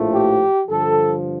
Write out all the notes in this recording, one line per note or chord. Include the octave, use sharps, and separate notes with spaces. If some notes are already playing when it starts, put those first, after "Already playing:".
Already playing: A#1 A2 F3 A3
G4
G2 D3 F3 A4